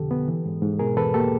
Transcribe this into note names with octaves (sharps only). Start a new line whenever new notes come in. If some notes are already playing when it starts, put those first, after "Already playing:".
Already playing: F2 B2 D3 G4 A4
B3
E3
G#2
G#2
B2 G#4 A#4
E2 A4 B4
A#3 G4 A4